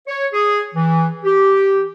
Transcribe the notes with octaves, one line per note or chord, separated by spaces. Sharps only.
C#5
G#4
E3
G4